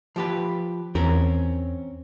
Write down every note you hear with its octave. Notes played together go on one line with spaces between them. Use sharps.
F3 G4 B4
E2 C4 C#4 A#4